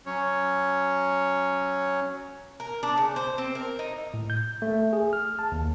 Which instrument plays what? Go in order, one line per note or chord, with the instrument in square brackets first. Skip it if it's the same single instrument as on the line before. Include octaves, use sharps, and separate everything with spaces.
[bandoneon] F#3 C#4 C#5
[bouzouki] A#4
D4
C#3
C5
C4
A#4
D#4
[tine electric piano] A2
G6
A3
G#4
F6
A5
D#2